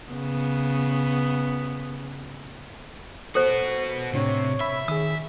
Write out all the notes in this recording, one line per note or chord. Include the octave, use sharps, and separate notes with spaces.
C#3 B3
B3 F#4 A4 C5
A2 C3 D4 C#5
E5 B5 E6 B6
D#3 G#4 E6